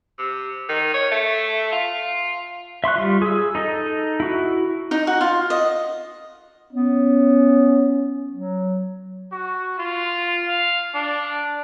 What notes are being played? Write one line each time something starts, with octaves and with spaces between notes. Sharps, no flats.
C3
D#3
C#5
A3
F4
E5 C6 C#6 F#6
G3 F4
G#4 E6
D#4 A4 D#5
E4 F#4
D#4
F#4
F4
D#5
B3 C#4
F#3
F#4
F4
F5
D4